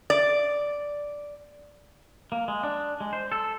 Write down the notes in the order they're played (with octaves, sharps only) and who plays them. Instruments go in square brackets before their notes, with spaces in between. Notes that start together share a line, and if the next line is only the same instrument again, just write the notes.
[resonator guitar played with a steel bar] D5
[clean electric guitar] A#3
G#3
D4
G#3
C5
A4